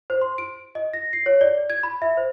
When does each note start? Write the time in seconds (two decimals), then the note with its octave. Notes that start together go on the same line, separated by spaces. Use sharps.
0.10 C5
0.22 C6
0.38 D7
0.75 D#5
0.93 A#6
1.13 C7
1.26 C#5
1.41 D5
1.70 G#6
1.83 B5
2.02 E5
2.17 C5